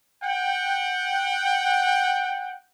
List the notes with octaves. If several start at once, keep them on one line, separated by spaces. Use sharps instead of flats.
F#5 G5